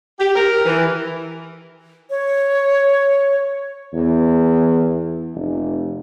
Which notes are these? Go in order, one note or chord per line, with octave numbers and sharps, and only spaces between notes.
G4
A#4
E3
C#5
E2
F1